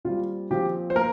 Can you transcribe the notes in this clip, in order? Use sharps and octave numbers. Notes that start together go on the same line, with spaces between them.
A#2 G3 C4 F4
A#2 F3 C4 G4
C5
A#3 A#4